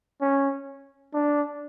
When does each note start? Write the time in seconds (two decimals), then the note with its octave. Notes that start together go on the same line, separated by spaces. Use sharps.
0.21 C#4
1.14 D4